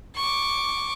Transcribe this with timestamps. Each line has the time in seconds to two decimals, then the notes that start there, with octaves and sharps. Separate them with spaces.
0.16 C#6 D6